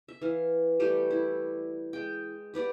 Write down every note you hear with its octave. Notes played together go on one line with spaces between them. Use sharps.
E5
E3 F5
G3 A3 G4
E4
G#3 G5
G4 B4 D5 F#5